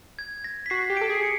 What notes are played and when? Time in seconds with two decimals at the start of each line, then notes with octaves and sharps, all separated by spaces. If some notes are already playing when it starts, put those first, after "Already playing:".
0.19 G#6
0.44 A#6
0.66 B6
0.70 F#4 C7
0.90 G4
0.97 A4 D7
1.09 G#4
1.15 C7
1.23 C#7